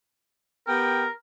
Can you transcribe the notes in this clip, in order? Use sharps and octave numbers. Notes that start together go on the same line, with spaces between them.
B3 G4 A#4 G5